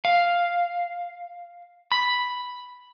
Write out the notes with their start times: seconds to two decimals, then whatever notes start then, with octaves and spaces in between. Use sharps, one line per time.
0.05 F5
1.92 B5